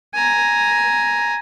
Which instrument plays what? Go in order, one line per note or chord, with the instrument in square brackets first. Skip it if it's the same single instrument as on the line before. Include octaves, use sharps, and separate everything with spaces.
[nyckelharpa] G#5 A#5